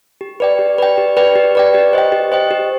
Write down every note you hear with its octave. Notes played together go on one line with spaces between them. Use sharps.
G4
B4 D5 G5
G4
B4 D5 G5
G4
B4 D5 G5
G4
B4 D5 G5
G4
C5 D#5 G5
G4
C5 D#5 G5
G4